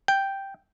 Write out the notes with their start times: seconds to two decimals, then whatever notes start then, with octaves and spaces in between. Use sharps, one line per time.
0.08 G5